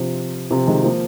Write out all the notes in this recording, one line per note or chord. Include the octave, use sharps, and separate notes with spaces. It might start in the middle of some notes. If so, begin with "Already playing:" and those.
Already playing: C3 F3
C3 F3
D#3 G#3
F3 A#3